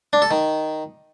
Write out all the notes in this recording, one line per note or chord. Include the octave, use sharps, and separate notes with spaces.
D4
A4
D#3